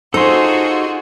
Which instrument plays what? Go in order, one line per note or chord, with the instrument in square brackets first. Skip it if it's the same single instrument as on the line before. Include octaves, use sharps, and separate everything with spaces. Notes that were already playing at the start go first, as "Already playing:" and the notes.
[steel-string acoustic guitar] D#4 [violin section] F4 F#4 G#4 [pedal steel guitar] A4 C6 [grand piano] C5